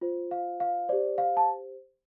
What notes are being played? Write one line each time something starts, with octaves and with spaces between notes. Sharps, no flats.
F4 C5
F5
F5
G4 C5 D5
F5
A5